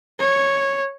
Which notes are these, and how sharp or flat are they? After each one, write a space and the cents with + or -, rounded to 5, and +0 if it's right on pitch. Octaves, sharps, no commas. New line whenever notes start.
C#5 -10